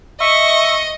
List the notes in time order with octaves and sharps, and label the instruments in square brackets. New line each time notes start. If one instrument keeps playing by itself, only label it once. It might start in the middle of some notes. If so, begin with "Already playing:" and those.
[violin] D#5 [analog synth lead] E5 [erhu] C#6